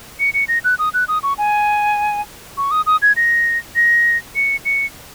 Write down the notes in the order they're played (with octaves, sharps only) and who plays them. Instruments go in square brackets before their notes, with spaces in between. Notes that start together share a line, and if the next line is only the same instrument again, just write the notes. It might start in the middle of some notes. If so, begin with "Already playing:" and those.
[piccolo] C#7
C#7
A#6
F#6
D#6
F#6
D#6
C#6
G#5
C#6
D#6
D#6
G#6
A#6
A#6
C#7
C#7